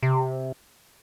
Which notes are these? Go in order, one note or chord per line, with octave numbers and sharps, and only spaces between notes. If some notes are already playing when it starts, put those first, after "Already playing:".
C3